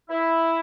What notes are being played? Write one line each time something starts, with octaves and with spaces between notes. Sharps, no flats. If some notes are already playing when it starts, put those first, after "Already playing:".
E4